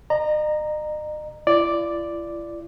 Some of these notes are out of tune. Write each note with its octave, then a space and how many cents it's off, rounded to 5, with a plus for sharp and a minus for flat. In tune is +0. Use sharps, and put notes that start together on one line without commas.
D#5 -40 A#5 +0
E4 +45 D5 +0